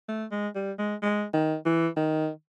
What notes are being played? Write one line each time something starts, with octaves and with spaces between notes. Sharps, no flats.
A3
G#3
G3
G#3
G#3
D#3
E3
D#3